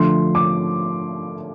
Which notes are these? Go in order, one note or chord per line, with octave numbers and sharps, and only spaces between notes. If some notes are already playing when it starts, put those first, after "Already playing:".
Already playing: D3 F3 A3 C6
D6